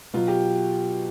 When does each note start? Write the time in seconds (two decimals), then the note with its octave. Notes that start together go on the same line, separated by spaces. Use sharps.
0.14 B2 F#3 F4
0.28 G4